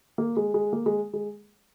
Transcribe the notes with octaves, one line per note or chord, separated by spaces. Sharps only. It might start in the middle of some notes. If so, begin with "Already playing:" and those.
A#3
G#3
G#3
A#3
G#3
G#3